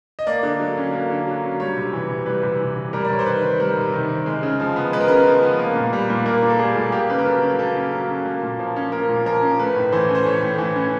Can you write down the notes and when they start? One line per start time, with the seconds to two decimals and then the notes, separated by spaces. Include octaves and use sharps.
0.19 D#5
0.27 A#3 D5
0.43 D3
0.60 F#3
0.77 C#4
0.93 A#3
1.10 D3
1.27 F#3
1.44 C#4
1.60 G3 C#5
1.77 C3
1.93 E3
2.10 C3
2.26 G3 B4
2.43 C3
2.60 E3
2.77 C3
2.93 G3 A#4
3.05 D5
3.10 C3 C#5
3.19 C5
3.26 D#3 B4
3.43 C4
3.60 G3 A#4
3.77 C3
3.94 D#3
4.09 C4
4.26 G#3
4.43 C#3
4.60 F3
4.76 B3
4.93 G#3 B4
5.01 A#4
5.08 C#3 B4
5.27 F3
5.42 B3
5.59 A#3
5.76 A#2
5.93 G3
6.10 A#2
6.26 A#3 A#4
6.43 A#2
6.50 A4
6.59 G3 G#4
6.76 A#2
6.92 A#3 G4
7.10 C#3 B4
7.19 A#4
7.25 F#3 A4
7.42 C#4
7.59 A#3 A4
7.76 C#3
7.93 F#3
8.10 C#4
8.25 A#3
8.42 A#2
8.59 F3
8.76 C#4
8.92 A#3 A#4
9.09 A#2
9.26 F3 A#4
9.43 C#4
9.59 A3 B4
9.76 A2
9.92 E3 C5
10.09 C#4
10.15 C5
10.25 A3 C#5
10.42 A2
10.58 E3
10.76 C#4